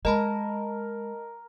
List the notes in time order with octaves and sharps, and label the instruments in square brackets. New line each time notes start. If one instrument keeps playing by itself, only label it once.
[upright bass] G#3 [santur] A#4 [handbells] D#5 A5 B5